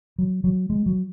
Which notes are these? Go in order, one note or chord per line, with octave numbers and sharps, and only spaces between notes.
F#3
F#3
G#3
F#3